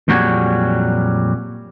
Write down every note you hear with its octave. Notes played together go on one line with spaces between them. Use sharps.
F2 A#2 F#3 G3 F#4 G#4